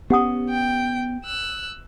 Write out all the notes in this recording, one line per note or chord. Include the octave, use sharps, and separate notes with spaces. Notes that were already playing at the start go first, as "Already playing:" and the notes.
B3 C#4 G4 F#5 D#6
G5
E6 F#6